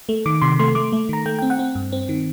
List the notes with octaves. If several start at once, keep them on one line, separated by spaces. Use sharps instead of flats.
A3
D#3 D6
C3 C6
A3 C6
A3 D6
A3
D#3 A#5
A3 G5
G5
C4
F#5
C4
G2
C4
D#3